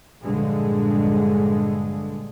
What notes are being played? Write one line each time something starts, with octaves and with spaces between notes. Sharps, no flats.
A#1 G2 D3 G#3